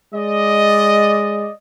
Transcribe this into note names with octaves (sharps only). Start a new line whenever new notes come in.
G#3 D5 D#5